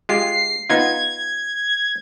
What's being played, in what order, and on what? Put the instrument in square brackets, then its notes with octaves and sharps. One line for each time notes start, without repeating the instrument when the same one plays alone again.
[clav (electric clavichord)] G#3 F4 G4 [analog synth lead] C7
[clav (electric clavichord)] B3 D#4 F4 [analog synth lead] G#6